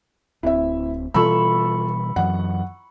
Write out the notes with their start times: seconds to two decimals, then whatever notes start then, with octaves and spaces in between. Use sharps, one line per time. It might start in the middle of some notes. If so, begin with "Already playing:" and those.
0.43 D1 C4 E4 E5
1.14 B2 E3 G3 F4 A4 B5 C#6 E6
2.16 F#2 E3 F#3 F#5